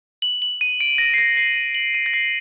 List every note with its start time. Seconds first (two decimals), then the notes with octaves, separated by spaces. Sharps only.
0.22 F#7
0.42 F#7
0.61 D#7
0.81 D7
0.98 A#6
1.14 C7
1.18 A#6
1.37 C7
1.56 D#7
1.75 F#7
1.94 D#7
2.06 A#6
2.13 C7